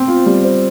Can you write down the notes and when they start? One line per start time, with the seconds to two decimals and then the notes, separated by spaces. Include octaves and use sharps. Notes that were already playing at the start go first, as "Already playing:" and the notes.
Already playing: C4 C5
0.08 F4
0.26 G3
0.44 C5